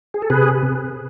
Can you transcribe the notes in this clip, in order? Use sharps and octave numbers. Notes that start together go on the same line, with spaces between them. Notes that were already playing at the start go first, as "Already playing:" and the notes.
G#4
A4
C3 G#4 B4